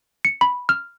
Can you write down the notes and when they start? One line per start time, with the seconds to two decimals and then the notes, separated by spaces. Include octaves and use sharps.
0.25 C#7
0.41 B5
0.69 F6